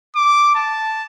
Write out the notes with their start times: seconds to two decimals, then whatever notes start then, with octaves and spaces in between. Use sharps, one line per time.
0.16 D6
0.55 A5